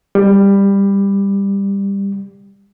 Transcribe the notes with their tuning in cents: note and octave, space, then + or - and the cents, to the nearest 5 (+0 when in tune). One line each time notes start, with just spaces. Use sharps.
G3 +15